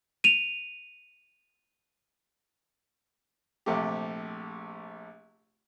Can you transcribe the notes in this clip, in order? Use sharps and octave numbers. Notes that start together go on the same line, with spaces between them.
D#7 F7
A#1 C3 A3 G4